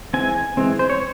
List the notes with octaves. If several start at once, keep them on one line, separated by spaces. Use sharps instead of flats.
E3 G#3 C4 G#5
E3 G#3 C4
C5
C#5